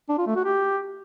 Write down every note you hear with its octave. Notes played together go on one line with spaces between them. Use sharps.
D4
F4
A3
F#4
G4